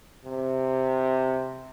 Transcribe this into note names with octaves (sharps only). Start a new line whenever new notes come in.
C3